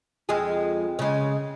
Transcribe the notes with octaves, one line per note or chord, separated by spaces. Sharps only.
F2 G#3 G#4
C#3 G#3